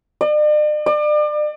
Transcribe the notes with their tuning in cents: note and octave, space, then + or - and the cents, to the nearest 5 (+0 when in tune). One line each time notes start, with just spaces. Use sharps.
D5 +45
D5 +35